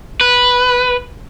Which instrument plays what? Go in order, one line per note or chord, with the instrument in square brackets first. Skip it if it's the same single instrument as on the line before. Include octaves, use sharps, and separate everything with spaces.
[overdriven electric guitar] B4